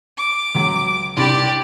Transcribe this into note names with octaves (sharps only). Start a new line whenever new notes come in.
D6
C#2 F#3
C2 D4 G4 D5 B5